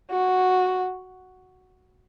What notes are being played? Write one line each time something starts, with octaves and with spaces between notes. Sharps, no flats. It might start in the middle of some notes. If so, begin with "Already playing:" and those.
F#4